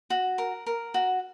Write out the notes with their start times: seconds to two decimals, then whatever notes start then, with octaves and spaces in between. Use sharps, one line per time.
0.10 F#4
0.38 A#4
0.66 A#4
0.94 F#4